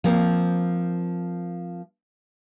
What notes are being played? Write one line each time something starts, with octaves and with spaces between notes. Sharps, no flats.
F3 A#3 C4